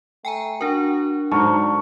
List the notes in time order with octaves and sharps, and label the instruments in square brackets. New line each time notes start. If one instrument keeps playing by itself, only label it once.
[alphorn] A3 [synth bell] G5 G#5 A#5
[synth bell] D4 A#4 [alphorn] F#4
[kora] G#2 F#3 D#4 [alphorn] D3 [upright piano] A5 C#6 F6